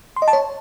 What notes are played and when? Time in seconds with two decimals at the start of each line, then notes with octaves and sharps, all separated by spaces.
0.16 C6
0.22 D#5
0.28 A5
0.33 C#5